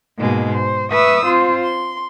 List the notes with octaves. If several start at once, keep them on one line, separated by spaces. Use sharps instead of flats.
G#2 B2 G#3 A#3
C5
B4 E5 C#6 D#6 E6
C4 F4 C5
C6